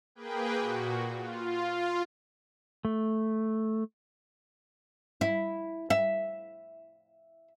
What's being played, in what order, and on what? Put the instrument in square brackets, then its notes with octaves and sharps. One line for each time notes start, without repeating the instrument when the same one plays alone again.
[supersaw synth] A#3 G#4 B4 G5
A#2 F#4
F4
[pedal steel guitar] A3
[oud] E4
E5